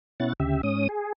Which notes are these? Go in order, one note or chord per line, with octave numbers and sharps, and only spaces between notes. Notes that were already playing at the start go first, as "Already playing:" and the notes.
B2 C#4 E4 F#5 A6
D2 C#3 G4 E5
G#2 C#4 D#6
G#4